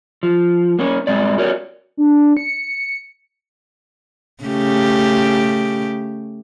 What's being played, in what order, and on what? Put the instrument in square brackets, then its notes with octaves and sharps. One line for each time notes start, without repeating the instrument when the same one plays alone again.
[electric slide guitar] F3
A#3 C#4
G2 A#2 G#3 C4 D5
F#4 A#4 C#5 D5
[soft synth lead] D4
C#7
[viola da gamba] C#3 A3 G4